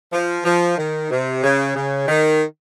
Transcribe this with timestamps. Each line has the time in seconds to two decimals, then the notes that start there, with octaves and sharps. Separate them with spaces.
0.13 F3
0.45 F3
0.78 D#3
1.11 C3
1.44 C#3
1.76 C#3
2.08 D#3